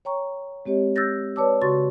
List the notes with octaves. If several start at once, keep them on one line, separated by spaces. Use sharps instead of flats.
C#5 G5 A#5 C#6
G#3 C4 G4 C#5 D#5
E6 F#6 G6 A6 A#6
B4 C#5 D5 A5 D6 E6
C#3 F#4 C6 C#6 A6